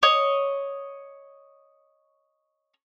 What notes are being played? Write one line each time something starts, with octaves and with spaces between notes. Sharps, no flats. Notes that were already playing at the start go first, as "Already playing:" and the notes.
C#5 D#5